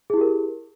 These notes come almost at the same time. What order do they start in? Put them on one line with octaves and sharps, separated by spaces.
G#4 E4 G4 A#4